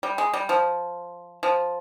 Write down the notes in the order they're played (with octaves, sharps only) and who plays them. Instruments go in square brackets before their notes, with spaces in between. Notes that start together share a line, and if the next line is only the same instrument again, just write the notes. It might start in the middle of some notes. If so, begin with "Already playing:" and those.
[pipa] G3
G#3
G3
F3
F3